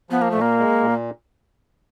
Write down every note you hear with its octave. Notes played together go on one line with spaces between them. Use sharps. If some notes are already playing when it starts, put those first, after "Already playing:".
F3 B3
A#3
A#2 A3
A#3
G#3
A#2